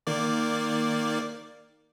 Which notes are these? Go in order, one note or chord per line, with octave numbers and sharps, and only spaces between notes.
D#3 A#3 D5